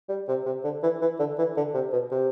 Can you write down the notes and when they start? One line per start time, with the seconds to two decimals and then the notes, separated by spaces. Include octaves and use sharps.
0.09 G3
0.28 C3
0.46 C3
0.64 D3
0.83 E3
1.01 E3
1.19 D3
1.38 E3
1.57 D3
1.74 C3
1.93 B2
2.11 C3